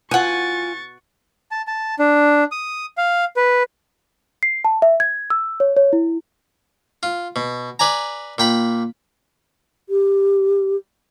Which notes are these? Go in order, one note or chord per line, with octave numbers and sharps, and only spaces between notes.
B2 F4 F#5 G#5 C#6 A6
A5
A5
D4
D#6
F5
B4
C7
A5
E5
G#6
E6
C#5
C#5
E4
F4
B2
B4 D5 G#5 A#5
A#2 G5 B5
G4